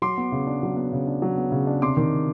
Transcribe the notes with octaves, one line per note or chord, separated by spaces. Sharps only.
F#3 C6 D6
B3
C#3
D4
F#3
B3
C#3
D4
F#3
B3
C#3
D4
C3 C6 D6
D#3